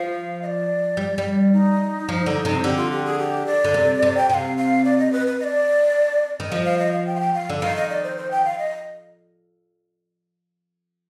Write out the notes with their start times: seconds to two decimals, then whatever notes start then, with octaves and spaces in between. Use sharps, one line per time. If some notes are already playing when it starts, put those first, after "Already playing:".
Already playing: F3 F5
0.42 D#5
0.46 D5
0.97 G3
1.18 G3
1.52 D#4
2.09 F3
2.26 D3
2.45 C3
2.63 D3 G4
2.77 F4
2.91 G4
3.05 G#4
3.19 G4
3.47 D5
3.64 D3
3.74 C3
4.02 C3
4.17 G5
4.29 C3 G5
4.34 F5
4.57 F5
4.85 D5
4.98 D#5
5.12 B4
5.27 B4
5.40 D#5
5.44 D5
6.40 D#3
6.51 F3 D#5
6.65 F5
6.79 D#5
6.93 F5
7.07 G5
7.16 F5
7.20 G5
7.34 F5
7.49 D3
7.62 D#3 F5
7.76 D#5
7.89 D5
8.03 C5
8.18 C5
8.31 G5
8.45 F5
8.59 D#5